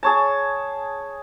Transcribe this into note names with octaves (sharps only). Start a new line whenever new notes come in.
G#4 C#5 A5